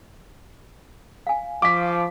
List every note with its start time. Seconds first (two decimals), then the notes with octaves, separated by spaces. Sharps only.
1.27 F5 G#5
1.62 F3 F5 C#6 D6 B6